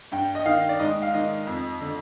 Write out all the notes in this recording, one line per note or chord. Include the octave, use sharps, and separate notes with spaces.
G2 G5
D#5
D#3 F5
D5
G#2 D#5
F5
D#3 D#5
F2
D3